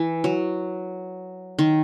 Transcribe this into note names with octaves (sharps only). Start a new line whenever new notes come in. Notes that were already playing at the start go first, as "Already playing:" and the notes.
Already playing: E3
F#3
D#3